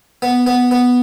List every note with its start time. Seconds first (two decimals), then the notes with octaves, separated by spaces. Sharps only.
0.22 B3
0.47 B3
0.71 B3